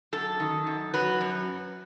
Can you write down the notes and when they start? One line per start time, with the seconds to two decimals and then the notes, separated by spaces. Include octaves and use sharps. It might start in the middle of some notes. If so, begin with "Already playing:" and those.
0.12 F#2 A4
0.40 D#3
0.67 F#2
0.94 F#3 B4
1.21 F#2